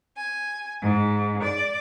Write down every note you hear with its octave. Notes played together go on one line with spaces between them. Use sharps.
G#5
G#2
D5